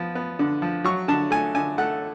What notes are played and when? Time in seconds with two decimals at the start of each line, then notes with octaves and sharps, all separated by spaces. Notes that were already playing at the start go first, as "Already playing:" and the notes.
Already playing: F3 B3
0.15 B3
0.39 D3
0.62 F3
0.84 F#3 C#6
1.08 D3 A5
1.31 A3 G#5
1.55 D3 G#5
1.78 A3 F#5